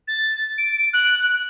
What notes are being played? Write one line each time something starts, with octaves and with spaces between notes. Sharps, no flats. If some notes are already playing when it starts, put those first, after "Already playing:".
A6
D7
F#6
F#6